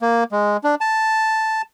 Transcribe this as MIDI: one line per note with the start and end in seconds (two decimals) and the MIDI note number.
0.02 0.24 58
0.32 0.57 56
0.64 0.75 62
0.81 1.62 81